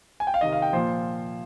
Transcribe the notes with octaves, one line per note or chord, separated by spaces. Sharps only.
G#5
G5
F5
C3 D#3 D#5
F5
G5
A#2 F3 C5